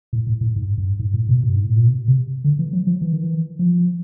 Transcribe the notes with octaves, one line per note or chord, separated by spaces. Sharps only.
A2
A2
A2
G#2
G2
G#2
A2
B2
G2
G#2
A2
A#2
B2
C3
D3
E3
F#3
F3
E3
D#3
E3
F3